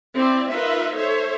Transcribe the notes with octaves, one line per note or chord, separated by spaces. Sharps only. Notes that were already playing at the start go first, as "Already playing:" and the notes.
C4 E4 D5
D#4 F4 A#4 B4 E5
A4 C5 C#5 E5